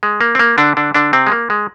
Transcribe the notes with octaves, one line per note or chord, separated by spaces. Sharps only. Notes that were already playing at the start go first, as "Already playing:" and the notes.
G#3
A#3
C4
A#3
D3 D4
D3 D4
D3 D4
C3 C4
G#3
A#3
G#3